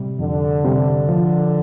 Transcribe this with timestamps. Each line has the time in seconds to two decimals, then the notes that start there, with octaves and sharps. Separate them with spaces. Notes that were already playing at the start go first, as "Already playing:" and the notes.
Already playing: C3 G3
0.19 F2 D3
0.65 C3 G3
1.09 F3